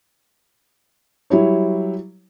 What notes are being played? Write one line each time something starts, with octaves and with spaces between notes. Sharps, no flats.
F#3 G3 E4 C#5